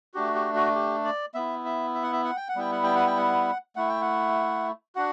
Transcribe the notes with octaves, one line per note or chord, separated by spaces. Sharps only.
A3 D4 F#4 G4
G4
F#4
G4
D5
B3 E4 E5
E5
E5
F#5
E5
F#5
G5
F#5
G3 B3 E4 G5
F#5
G5
F#5
G5
F#5
A3 E4 F#5
G5
F#5
D4 F#4 F#5